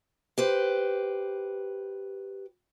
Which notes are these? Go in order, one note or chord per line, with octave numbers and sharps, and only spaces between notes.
G4 B4 C5